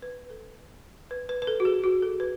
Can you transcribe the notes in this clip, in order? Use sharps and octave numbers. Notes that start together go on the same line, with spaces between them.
B4
A4
B4
B4
B4
A4
F#4
G#4
F#4
A4
B4